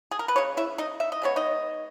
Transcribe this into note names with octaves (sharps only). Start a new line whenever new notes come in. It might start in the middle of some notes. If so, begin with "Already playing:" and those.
G#4
A#4
B4
C#3 G#3 C#5
E4 E5
D#4 D#5
E5
D#5
C#3 G#3 B3 C#5
D#4 D#5